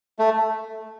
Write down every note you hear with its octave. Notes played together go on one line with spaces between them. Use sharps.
A3